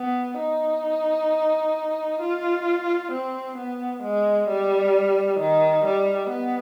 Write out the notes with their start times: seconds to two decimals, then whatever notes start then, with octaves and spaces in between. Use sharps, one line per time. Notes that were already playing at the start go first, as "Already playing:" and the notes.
Already playing: B3
0.39 D#4
2.21 F4
3.12 C4
3.58 B3
4.03 G#3
4.48 G3
5.40 D#3
5.85 G3
6.30 B3